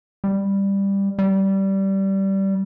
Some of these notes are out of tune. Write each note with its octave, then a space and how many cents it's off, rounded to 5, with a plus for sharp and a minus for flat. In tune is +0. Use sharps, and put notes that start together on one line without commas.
G3 +10
G3 -15